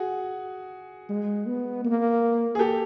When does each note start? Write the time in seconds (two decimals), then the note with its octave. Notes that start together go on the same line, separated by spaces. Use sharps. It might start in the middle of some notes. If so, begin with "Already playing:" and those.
Already playing: F#4 G#4
1.09 G#3
1.47 B3
1.85 A#3
2.55 G#4
2.59 G4 A4